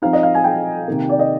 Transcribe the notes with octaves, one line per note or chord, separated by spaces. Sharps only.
F3 C4 D#4 F5
D#5
F5
G#5
G5
C3 D#3 A#3
D5
D#5